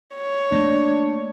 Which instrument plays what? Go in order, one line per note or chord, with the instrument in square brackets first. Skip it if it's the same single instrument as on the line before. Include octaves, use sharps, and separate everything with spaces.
[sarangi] C#5
[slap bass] A3 A#3 [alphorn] D4